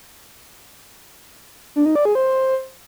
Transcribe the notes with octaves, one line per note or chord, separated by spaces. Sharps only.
D4
D#4
D5
G#4
C5